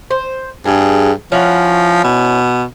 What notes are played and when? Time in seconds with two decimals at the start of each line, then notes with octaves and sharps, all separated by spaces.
0.11 C5
0.66 G2 G#4
1.32 F3 C#4 E4 F#4
2.04 B2